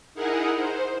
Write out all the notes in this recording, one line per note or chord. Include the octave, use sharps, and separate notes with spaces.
D#4 E4 G#4 A#4 F#5
C5